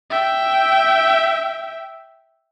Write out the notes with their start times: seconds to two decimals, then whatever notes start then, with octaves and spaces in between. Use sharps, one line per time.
0.10 E5 G5